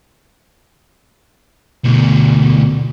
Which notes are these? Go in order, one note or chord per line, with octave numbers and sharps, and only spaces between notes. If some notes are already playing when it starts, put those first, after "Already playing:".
D2 B2